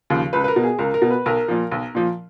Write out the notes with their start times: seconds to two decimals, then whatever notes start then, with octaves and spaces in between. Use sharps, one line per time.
0.10 D#2 C#3 F3
0.33 C#2 B4
0.44 B4
0.48 A#4
0.56 B2
0.63 G#4
0.79 C#2 A#4
0.94 A#4
1.02 B2
1.11 B4
1.26 B1 A#4
1.48 A#2 F3
1.72 B1
1.95 A#2 F3